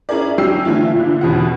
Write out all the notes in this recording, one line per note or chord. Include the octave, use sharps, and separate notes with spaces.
C#4 E4 G#4 A#4 D5
F#3 G3 C#4 G5 E6 C7
A#2 D3 E3 A3 E4 F4
A#2 D3
E2 B2 C#4 F#5